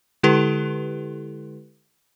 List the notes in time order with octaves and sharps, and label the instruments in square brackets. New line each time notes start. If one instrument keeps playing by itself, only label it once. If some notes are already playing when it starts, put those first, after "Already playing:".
[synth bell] D3 G#3 E4 G4 A4 B4